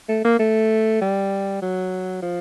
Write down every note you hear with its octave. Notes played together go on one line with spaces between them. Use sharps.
A3
A#3
A3
G3
F#3
F3